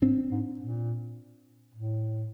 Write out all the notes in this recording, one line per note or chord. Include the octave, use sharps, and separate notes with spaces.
G#2 C4 D4
G#2
A#2
A2